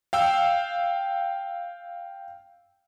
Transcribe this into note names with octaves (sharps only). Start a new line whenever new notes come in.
F5 G5 E6